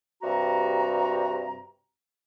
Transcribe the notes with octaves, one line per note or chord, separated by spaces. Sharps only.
G2 C3 F#4 A#5